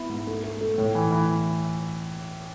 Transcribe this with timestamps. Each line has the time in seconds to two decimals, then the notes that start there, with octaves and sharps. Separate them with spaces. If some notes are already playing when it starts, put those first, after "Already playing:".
Already playing: B3 E4
0.09 G#2
0.27 A3
0.44 A3
0.61 A3
0.78 A2
0.95 E3
1.12 E3